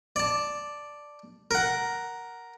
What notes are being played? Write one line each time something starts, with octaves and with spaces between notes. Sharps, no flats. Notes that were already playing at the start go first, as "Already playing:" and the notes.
D5 A5
A#4 F#5